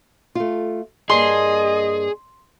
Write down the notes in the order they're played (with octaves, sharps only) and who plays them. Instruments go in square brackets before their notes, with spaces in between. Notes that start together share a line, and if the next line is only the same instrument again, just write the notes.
[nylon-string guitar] A3 F4
[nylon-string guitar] G2 A#3 [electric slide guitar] G#4 [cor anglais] D#5 [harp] C6